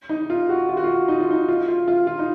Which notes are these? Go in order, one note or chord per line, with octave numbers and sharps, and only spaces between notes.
D#4
F4
F#4
F4
F#4
F4
D#4
F4
D#4
F4
F4
F4
F4
D#4